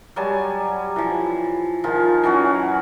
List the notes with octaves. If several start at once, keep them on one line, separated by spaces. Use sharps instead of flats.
F#3 G3 G#5 A5
E3 F3
D#3 F3 F4 G#4
E3 F#3 C#4 F#4